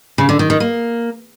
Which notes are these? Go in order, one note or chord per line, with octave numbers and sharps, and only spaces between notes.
C#3
D3
D#3
D#3
A#3